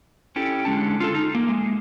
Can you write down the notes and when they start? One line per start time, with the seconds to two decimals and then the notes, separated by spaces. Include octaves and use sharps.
0.36 C#4 E4 G4 A4
0.65 D3 G#3 C#4 A5
1.00 F4 A4
1.15 D#4
1.35 A#3
1.48 G#3